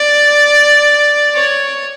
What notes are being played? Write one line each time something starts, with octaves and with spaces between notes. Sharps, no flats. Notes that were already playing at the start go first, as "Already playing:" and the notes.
Already playing: D5
C#5